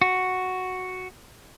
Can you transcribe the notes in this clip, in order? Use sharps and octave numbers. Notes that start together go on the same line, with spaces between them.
F#4